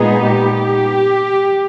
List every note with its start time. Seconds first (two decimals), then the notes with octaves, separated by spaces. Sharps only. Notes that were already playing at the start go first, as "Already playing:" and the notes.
Already playing: A#2 G#3 B3 D#4 G#4
0.24 G4